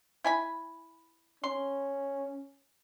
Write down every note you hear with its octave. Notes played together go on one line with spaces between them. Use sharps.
E4 G#5 B5
C#4 C6